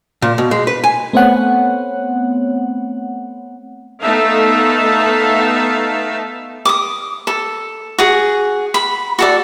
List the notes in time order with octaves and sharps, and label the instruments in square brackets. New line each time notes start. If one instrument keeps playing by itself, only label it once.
[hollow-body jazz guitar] A#2
B2
G#3
B4
G#5
[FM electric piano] A3 B3 C4 C#5 F#5
[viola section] A3 B3 D#4 E5 F5 A5
[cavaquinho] D6 D#6
A4
F#4 G#4
B5
F#4 A4 D5